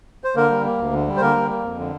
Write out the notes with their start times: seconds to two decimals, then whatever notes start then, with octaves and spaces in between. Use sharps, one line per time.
0.24 C5
0.35 D3 A#3 A#4
0.50 G3
0.64 A#3
0.79 D2
0.93 D3
1.08 G3
1.17 C5
1.21 D3 A#3 A#4
1.36 G3
1.49 A#3
1.63 F2
1.79 D3